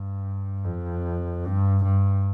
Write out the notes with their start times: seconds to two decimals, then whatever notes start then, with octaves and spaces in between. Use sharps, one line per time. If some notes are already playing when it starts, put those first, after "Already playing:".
Already playing: G2
0.64 F2
1.45 G2
1.84 G2